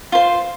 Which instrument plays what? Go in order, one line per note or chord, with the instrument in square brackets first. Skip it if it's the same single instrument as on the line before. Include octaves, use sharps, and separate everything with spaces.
[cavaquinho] F4 C5